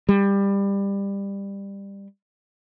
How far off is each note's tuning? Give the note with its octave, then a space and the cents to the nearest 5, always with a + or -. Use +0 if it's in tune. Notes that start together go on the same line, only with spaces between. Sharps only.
G3 +20